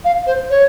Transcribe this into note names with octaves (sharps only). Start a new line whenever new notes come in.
F5
C5
C#5